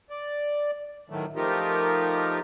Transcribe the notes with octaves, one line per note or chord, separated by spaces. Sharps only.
D5
A2 D#3 E3 F#3 A3
F3 A3 D#4 F4 G4 A#4